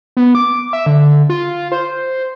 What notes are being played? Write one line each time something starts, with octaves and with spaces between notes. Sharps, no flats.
B3
D6
E5
D3
F4
C5